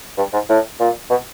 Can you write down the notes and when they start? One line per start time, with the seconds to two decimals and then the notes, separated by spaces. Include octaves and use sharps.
0.18 G2
0.33 G#2
0.49 A2
0.80 A#2
1.10 B2